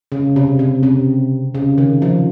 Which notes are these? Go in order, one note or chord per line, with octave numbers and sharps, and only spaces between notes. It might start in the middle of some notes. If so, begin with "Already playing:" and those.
C#3
C3
C3
C3
C#3
D#3
F3